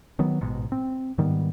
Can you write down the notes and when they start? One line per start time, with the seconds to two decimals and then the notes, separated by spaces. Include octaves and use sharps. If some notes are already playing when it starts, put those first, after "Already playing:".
0.19 D#3 F#3 B3
0.41 A1 G#2 B2
0.72 C4
1.18 G#2 D#3 G3 B3